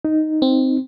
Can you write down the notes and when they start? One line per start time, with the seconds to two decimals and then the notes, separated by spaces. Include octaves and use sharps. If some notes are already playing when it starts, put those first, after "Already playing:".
0.05 D#4
0.42 C4